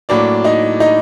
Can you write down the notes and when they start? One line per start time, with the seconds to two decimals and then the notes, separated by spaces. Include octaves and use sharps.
0.09 A2 F#3 A#3 D4 D5
0.44 D#4 D#5
0.80 D#4 D#5